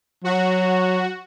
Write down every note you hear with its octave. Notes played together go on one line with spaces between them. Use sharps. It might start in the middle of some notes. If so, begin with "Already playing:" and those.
F#3 F#4